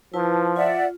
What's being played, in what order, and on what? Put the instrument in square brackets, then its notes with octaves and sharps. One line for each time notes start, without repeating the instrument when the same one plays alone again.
[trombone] F3 [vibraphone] E4 B4 A5
[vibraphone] F4 [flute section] D5 E5 F#5